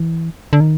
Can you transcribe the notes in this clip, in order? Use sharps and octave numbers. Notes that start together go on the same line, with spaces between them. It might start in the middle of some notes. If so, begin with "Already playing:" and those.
Already playing: E3
D3
D#3